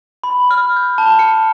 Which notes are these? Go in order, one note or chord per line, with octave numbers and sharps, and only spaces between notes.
B5
F6
G6
A5
C#7